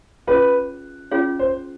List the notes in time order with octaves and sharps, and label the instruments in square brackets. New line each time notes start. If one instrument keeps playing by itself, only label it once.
[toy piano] C#4 F4 G#4 C#5 F5 [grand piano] B4
[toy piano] C#4 F4 G#4 C#5 F5
[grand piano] C5